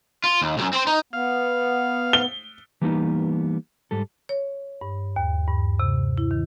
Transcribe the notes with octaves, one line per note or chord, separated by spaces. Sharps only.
F4
D#2
C2 F#2
C4 C5
D#4
B3 F5
G7
E3 G3 A#3 B3 C#4 D#4
G#2 G3 A4
C#5
G2
D#2
G2
C3
E4
D#3